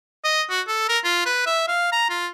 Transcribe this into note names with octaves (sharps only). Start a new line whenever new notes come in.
D#5
F#4
A4
A#4
F4
B4
E5
F5
A#5
F4